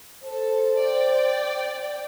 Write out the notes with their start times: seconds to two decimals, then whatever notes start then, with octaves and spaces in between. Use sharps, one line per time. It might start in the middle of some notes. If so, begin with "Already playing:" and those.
0.24 A4 C5
0.78 D5 G5